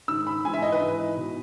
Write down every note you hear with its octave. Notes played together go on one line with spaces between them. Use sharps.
G#2 D#3 E6
B5
G#2 E3 G#5
E5
D#5
B4
G#2 E3
B2